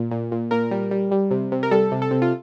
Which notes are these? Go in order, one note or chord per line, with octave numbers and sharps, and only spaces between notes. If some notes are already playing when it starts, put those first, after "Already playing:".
Already playing: A#2
A#2
A#2
A#2 A#4
G3
G3
G3
C3
C3
A#4
G3 A4
C3
A4
C3
F4